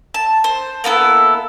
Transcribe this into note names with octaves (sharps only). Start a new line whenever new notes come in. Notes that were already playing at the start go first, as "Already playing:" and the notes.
A5
C5
A#3 B3 E4 A4